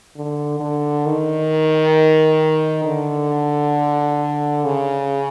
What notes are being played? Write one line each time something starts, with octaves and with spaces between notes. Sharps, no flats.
D3
D3
D#3
D3
C#3